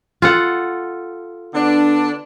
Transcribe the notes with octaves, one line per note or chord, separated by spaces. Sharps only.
F4 A4 F#5
D3 B3 D4